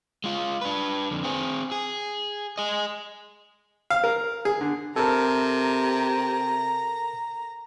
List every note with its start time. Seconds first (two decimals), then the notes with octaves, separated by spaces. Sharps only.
0.24 G#3 F4
0.61 D4 B4
1.11 F2 D3
1.24 C4 G#4
1.71 G#4
2.58 G#4 D#5
3.90 F5
4.04 A#4
4.45 G#4
4.61 D3
4.96 C3 A4 A#4 A#5